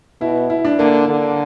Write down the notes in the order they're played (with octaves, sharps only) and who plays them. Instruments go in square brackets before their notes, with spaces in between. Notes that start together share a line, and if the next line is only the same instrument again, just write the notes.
[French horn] B2 [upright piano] E4
[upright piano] E4
D4
[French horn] D3 [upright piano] A#3
[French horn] D3